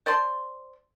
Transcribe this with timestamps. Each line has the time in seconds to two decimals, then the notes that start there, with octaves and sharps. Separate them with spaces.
0.06 C5 D5 A5 C6